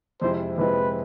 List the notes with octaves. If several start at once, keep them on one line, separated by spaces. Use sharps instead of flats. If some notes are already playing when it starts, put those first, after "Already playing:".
F2 C3 G#3 C4 E4 C5
F2 C3 G#3 C4 E4 B4